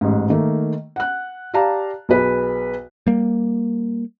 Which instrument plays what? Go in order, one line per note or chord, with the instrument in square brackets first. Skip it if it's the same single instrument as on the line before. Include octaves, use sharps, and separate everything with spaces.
[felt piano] A1 G#2
D#3 A3 A#3
F#5 F#6
G4 D5 F5 A5 A#5
B1 G#4 B4
[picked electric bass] G3 A#3